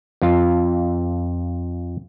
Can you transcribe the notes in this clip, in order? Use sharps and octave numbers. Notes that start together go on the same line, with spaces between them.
F2 F4